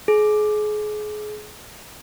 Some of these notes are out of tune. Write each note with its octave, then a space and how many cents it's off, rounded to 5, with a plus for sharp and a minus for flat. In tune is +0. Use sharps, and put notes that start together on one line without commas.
G#4 +30